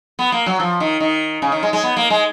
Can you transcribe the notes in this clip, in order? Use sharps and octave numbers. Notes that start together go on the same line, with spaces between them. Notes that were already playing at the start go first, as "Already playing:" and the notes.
B3
A#3
F#3
F3
D#3
D#3
C#3
D#3
G#3
G#3
B3
A#3
G#3